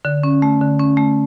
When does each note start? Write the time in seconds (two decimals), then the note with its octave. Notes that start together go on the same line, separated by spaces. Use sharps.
0.05 D3
0.23 C#4
0.42 A3
0.61 D3
0.79 C#4
0.97 A3